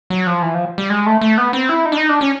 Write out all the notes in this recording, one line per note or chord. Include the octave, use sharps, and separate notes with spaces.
F#3
F3
E3
F3
G3
G#3
A3
A3
B3
C4
E4
D#4
D4
D#4
D4
C#4